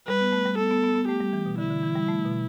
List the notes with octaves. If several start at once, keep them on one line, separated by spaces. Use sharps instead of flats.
G3 B4
B3
A3
G3
B3 A4
B3
B3
B3
A3 G4
G3
E3
B2
D3 E4
D3
E3
G3
A3
B2